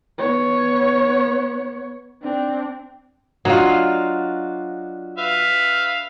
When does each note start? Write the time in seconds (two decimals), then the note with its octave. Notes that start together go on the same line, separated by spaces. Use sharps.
0.18 B3 C#5
2.22 C4 D4
3.45 F#3 D4 F4 F#4 D#5
5.18 B4 E5 F5